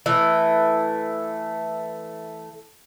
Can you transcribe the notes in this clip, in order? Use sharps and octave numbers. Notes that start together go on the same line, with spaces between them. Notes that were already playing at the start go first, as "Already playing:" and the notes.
E3 A3